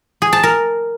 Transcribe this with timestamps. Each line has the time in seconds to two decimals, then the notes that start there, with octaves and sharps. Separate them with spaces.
0.22 G#4
0.33 A5
0.43 A#4